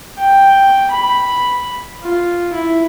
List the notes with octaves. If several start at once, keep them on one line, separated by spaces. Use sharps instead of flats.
G5
B5
F4
E4